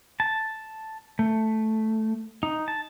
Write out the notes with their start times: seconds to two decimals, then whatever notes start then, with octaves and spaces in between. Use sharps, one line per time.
0.20 A5
1.19 A3
2.43 D#4
2.68 A5